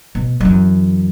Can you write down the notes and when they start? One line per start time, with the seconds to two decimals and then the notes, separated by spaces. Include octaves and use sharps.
0.15 B2
0.40 F#2 E3